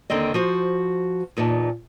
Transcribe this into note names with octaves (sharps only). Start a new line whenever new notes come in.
D#2 D3 D#3 C4 D#5
F3 F#4 C5
E2 A#2 D#4 A5